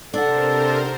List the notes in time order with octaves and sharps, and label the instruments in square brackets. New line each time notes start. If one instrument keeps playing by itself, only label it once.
[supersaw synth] C3 A#4 C5 [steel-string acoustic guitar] D4 F#5 [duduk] A4